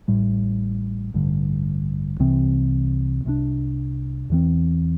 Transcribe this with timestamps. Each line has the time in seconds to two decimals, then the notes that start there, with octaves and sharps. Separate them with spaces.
0.08 A1 A2 G3
1.14 A1 G2 D3
2.19 C2 C3 E3 C4
3.25 C2 C3 G3 D4
4.30 E2 E3 C4